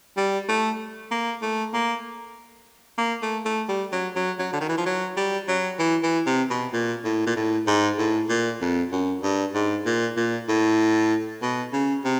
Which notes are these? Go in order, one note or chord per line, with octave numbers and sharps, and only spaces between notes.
G3
A3
A#3
A3
A#3
A#3
A3
A3
G3
F#3
F#3
F#3
D3
D#3
E3
F3
F#3
G3
F#3
E3
E3
C3
B2
A#2
A2
A#2
A2
G#2
A2
A#2
F2
F#2
G2
G#2
A#2
A#2
A2
B2
C#3
C3